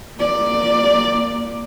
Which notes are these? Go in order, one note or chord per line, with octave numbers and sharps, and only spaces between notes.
A#3 D5